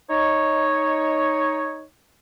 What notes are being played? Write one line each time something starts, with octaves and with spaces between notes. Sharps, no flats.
D#4 C#5